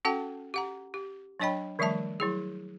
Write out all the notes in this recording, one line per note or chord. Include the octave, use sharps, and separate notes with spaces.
C#4 F#4 A4 F#5 G5 A5
G4 F#5 A#5
G4
F#3 D4 C#5 D#5 G5 B5
D#3 F3 G3 A3 E5 A5
F#3 E4 G#4